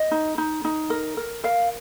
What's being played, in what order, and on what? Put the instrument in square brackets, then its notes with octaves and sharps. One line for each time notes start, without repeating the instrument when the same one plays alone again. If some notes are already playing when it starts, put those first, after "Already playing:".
Already playing: [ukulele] D#5
D#4
D#4
D#4
A#4
A#4
A#4 F5